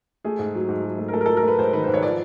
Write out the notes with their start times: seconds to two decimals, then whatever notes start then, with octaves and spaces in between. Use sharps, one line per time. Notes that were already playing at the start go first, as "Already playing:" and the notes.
0.25 A3 G#4
0.39 G#2
0.55 F#3
0.69 G#2
0.84 F#3
0.98 A3
1.08 A#4
1.13 A3 A4
1.21 A#4
1.26 F#3 A4
1.37 A#4
1.43 A3 B4
1.59 G#2 C5
1.73 D#3 B4
1.84 G#2 C5
1.94 C#5
2.03 F3 D5